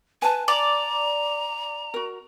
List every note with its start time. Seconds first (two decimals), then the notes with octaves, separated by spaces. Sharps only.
0.22 B4 G#5 A5
0.48 D5 A#5
1.94 F#4 A#4